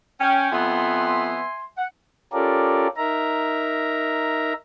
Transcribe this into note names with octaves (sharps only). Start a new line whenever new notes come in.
C#4 G5
F2 B3 E5 G#5 C6
F#5
C#4 F4 G4 A4 A#4 D5
D#4 A#4 E5 A#5